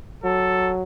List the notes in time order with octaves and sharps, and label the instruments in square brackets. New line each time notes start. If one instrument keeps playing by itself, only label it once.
[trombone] F#3 [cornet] A4